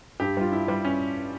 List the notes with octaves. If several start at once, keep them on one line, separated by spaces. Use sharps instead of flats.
G2 G4
G3 F4
G2 E4
G3
C#4